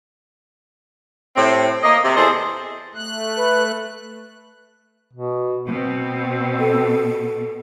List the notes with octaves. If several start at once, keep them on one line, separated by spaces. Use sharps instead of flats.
A2 C3 C4
A#3 D#5
C3
E2 G#4 A4 C5 D#5
A3 F#6
B4
B2
B2 C4
A4